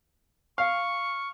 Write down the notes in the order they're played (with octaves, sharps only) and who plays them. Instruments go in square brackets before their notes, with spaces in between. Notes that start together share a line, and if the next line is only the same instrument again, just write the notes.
[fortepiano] F5 [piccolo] C#6